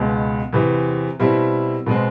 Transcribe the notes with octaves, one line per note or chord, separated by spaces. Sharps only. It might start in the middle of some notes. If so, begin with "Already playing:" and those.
Already playing: C#2 B2 G#3 B3
E2 C3 E3
B2 G3 C4 E4
B2 G#3 C4